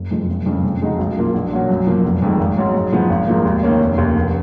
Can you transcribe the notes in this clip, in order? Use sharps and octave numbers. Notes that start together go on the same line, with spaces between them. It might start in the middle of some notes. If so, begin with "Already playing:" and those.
Already playing: F#1
F2 F3 G#3
F#1
F2 C#3
F2
C#3 G#3 D#4 F#4
B1
B2 A#3 F4
A#1
A#2 F#3 C#4 F#4
F#2
F3 A#3
F1
F2 D#3 G#3
G#1
G#2 F#3 C#4
G#2
F3 G#3 B3
G#1
G#2 F3 A#3
D#2
D#3 A#3 C#4
F1
D#2 C#3
F1